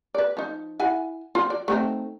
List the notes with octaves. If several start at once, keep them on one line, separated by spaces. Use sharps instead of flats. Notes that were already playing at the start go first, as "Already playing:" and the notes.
B4 D5
F3 D#4
E4 F#5 G#5
F3 F4
D5
A3 C4 D#4